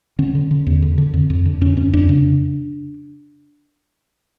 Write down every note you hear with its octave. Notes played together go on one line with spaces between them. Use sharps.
D3 C#4
D3
D3
E2
D3
D3
F2
F2
D3
F2 C#4
F2 C#4
F2 D4
C#3